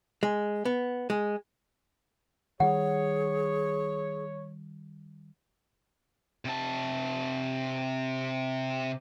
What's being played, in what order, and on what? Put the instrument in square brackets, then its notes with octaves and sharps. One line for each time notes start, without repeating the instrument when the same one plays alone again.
[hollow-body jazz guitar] G#3
B3
G#3
[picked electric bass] D#3 G3 [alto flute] G#4 [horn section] C#5 [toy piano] F#5
[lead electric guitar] C3 A5